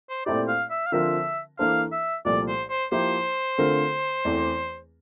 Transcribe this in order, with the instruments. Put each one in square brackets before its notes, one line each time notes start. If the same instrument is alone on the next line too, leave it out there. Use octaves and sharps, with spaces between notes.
[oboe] C5
[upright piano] A#2 A3 C4 E4 G4 [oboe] D5
[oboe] F5
E5
F5
[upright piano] D3 F3 C4 F4 A#4 [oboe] E5
[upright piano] E3 A#3 D4 A4 C5 [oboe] F5
[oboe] E5
[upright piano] C2 A#2 F3 A3 [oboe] D5
[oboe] C5
C5
[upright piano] F3 A#3 E4 G4 [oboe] C5
[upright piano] D3 A3 C4 F4 A#4
E2 E3 A3 C4